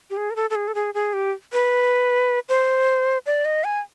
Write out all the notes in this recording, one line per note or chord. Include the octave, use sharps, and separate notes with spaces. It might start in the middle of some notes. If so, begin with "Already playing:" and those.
G4
G#4
A#4
A4
A4
G#4
A4
G#4
G#4
G4
B4
C5
D5
D#5
G#5